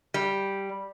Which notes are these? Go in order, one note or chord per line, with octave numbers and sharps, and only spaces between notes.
G3